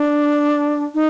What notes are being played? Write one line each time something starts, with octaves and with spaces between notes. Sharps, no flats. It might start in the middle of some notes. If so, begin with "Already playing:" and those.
Already playing: D4
D#4